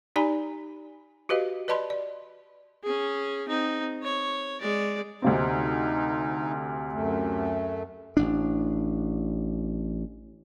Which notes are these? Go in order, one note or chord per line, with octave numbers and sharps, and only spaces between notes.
D#4 G4 D5 G#5 A#5 B5
F#4 G4 B4 D#5 F5
B4 D5 D#5 A5 B5 C6
D5
C#4 G#4
C4 D#4
C#5
G#3 D5
D2 C3 C4 D#4
F#2 A3
A1 D4